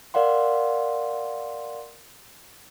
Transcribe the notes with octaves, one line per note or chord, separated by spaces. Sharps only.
A#4 D5 F5 F#5 C6